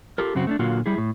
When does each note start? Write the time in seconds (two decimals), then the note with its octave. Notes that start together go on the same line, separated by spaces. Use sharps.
0.18 F4 G4 A4 A#4
0.35 F#2 C#3 F#3 C4 F#4
0.47 A3 C#4 D4
0.59 A#2 D3 F#3 A#3 F4 F#4
0.86 G3 E4 G#4
0.98 A2